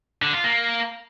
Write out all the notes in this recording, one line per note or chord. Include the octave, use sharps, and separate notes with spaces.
D3
F4
A#3